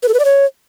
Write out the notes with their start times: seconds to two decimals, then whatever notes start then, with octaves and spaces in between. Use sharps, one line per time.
0.03 B4
0.08 A4
0.14 B4
0.19 D5
0.25 C#5